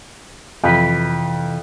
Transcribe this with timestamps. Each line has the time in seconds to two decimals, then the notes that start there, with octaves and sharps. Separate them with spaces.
0.64 F2 C3 E3 B4